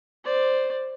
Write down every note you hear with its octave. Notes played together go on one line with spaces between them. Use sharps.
C5 D5